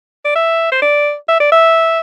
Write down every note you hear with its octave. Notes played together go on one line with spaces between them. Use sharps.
D5
E5
C5
D5
E5
D5
E5